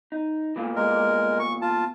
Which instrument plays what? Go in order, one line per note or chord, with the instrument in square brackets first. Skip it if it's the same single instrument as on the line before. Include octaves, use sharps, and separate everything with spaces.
[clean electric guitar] D#4
E2 A#2 E3
[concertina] G#3 A#4
C#6
F4 A5